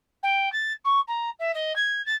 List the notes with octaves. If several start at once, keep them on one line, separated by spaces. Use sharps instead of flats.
G5
A6
C#6
A#5
E5
D#5
G#6
A6